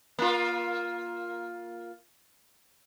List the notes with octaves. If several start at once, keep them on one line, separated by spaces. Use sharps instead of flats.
A#3 F4